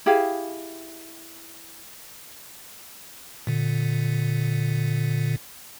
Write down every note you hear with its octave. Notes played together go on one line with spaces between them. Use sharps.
E4 G4 G#4 F5
A#2 D3